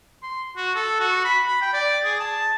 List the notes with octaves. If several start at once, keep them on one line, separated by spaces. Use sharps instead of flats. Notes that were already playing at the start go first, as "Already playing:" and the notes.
C6
F#4
A4
F#4
B5
B5
G5
D5
G#4
A5